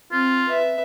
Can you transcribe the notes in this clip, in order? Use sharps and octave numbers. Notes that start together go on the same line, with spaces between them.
C4 F4
B4 E5